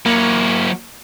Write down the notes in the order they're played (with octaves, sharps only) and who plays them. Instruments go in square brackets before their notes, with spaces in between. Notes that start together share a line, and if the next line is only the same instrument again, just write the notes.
[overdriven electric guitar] F#3 E4 [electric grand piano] A#3